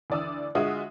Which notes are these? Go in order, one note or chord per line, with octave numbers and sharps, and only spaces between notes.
D2 E3 D5 D#6 E6
D3 G#3 F4 F#4 E5 D#6